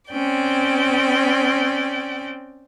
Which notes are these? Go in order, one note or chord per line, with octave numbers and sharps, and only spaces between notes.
C4 C#4 D5 G5